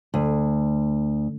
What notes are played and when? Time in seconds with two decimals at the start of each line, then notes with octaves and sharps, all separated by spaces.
0.14 D2